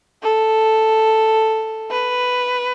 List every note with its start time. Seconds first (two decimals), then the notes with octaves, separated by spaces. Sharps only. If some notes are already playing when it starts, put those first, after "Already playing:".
0.23 A4
1.90 B4